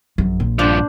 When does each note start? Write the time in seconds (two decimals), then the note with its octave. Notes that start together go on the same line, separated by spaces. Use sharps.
0.18 A#1 F#2
0.40 A#2
0.59 G2 F3 D4 C5